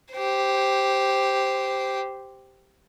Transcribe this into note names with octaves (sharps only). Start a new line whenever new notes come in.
G4 C5